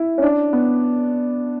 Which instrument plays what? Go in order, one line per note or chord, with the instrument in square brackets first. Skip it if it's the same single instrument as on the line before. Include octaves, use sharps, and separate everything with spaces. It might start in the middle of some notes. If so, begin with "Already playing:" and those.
Already playing: [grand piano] E4
C#4
D4
B3